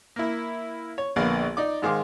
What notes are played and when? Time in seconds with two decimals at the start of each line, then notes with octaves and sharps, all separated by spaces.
0.16 A#3 E4
0.98 C#5
1.16 A#1 D3 A#3 B3 F5
1.57 D#4 D5 D6
1.82 G#2 D#3 G#3 C5 F5 D6